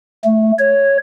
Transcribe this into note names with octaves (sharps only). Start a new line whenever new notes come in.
A3
C#5